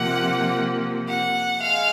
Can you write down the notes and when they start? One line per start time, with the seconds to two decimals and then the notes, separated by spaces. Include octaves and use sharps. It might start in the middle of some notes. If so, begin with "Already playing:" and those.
Already playing: C3 F3 A#3 F#5
1.08 F#5
1.62 G#3 F5